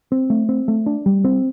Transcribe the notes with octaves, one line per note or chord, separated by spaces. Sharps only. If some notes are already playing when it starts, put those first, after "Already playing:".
C4
A3
C4
A3
D4
G3
C4